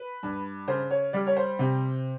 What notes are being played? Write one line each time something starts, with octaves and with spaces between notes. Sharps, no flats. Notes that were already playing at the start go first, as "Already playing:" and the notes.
Already playing: B4
G2
C#3 C5
C#5
G3 D5
C#5
C5
C3